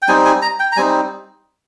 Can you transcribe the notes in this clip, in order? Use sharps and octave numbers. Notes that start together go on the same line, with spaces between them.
G5
G3 C4 D#4 G#5
G#5
A#5
G5
A#5
G3 C4 D#4 G#5